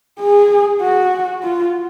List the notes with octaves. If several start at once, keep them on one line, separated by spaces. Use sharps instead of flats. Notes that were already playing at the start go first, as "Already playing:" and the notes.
G#4
F#4
F4